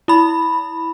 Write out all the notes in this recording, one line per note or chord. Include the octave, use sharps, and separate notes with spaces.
E4 B5